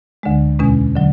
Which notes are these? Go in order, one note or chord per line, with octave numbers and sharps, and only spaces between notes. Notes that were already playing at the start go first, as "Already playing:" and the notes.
D2 D3 G#3
E2 B2 G#3 C#4
D3 F#3